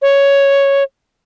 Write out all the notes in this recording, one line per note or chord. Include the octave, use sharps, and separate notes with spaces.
C#5